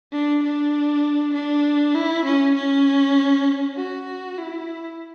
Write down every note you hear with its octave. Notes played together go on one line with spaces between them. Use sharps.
D4
D4
D4
E4
C#4
C#4
F#4
E4